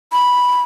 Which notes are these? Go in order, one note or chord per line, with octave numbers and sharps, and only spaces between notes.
B5